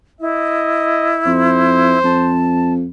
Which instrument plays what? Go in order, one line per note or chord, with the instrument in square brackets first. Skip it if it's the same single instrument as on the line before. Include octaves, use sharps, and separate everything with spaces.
[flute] E4 [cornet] D#5
[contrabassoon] F2 [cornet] C5
[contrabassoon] F2 [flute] A5